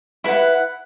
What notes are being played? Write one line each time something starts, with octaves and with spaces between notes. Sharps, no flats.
E4 B4 F#5